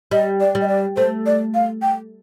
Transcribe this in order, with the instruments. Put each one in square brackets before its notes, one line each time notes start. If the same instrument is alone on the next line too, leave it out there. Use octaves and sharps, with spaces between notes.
[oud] G3 [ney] D#5
[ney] D5
[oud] G3
[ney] D#5
D5
[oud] A3 [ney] C5
[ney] D5
F5
G5